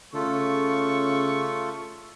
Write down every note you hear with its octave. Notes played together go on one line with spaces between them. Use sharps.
C#3 A3 F4 A4 C#6